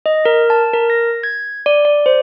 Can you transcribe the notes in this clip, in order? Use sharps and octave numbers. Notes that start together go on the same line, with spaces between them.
D#5
A#4
A5
A#4
A#6
G#6
D5
D5
C5